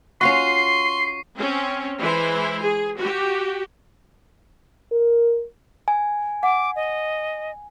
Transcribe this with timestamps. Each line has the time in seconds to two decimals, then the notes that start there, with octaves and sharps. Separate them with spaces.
0.21 C#4 F4 F#4 C6 C#6 C7
1.37 C4 C#4
1.99 E3 G#3 E4 C5
2.64 G#4
2.98 F#4 G4
4.92 A#4
5.88 G#5
6.43 F#5 D6
6.76 D#5